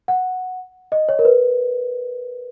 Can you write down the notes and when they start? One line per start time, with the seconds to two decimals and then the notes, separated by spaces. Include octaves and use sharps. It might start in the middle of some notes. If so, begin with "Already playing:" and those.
0.08 F#5
0.92 D#5
1.09 C#5
1.19 A#4
1.25 B4